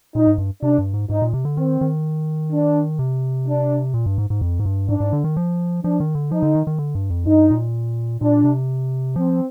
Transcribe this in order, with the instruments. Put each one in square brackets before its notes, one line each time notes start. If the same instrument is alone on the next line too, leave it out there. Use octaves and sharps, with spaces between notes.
[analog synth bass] A#2 [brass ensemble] D#4
[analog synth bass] G#2
G2
[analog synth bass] C3 [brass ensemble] D4
[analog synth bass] G2
G#2
[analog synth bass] G#2 [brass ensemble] D#4
[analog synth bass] A#2
C3
D3
[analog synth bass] D#3 [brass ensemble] C4
[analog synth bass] D#3
[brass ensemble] D4
[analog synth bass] C3
[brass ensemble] D4
[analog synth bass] A#2
G2
G#2
G#2
F2
G#2
G2
[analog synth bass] G#2 [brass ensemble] D4
[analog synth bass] G#2
D3
D#3
F3
[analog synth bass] F3 [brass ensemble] D4
[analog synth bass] D#3
D3
[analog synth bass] F3 [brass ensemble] D#4
[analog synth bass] D3
D#3
D#3
D3
G2
F2
[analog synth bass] G2 [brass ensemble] D#4
[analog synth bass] A#2
[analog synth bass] A#2 [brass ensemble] D4
[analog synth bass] C3
[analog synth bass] F3 [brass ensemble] C4